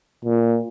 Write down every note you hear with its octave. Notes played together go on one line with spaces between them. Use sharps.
A#2